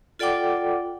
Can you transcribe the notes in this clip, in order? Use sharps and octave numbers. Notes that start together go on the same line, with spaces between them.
F4 A4 D5 F#5 G5 D6